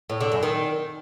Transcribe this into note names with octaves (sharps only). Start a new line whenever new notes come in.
A2
D3
F#2
D#3